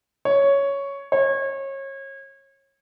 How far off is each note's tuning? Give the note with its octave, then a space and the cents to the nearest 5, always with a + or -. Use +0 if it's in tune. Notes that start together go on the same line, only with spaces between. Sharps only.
C#5 +5
C#5 -30